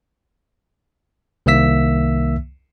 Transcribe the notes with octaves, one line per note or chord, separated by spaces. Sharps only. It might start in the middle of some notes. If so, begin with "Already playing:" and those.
C2 D#3 A#3 E5 E6 B6